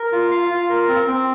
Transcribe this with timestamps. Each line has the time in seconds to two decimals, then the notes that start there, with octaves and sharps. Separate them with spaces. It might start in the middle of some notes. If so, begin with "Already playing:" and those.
Already playing: A#4
0.12 F4
0.31 F5
0.50 F4
0.69 A#4
0.88 C4
1.07 C4